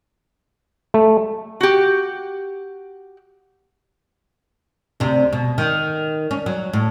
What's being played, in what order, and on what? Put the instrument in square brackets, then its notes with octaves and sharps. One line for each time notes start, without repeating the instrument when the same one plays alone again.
[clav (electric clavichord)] A3
[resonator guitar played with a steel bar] F#4 G4
[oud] D2 C3
B2
D#3
C#4
F#3
A2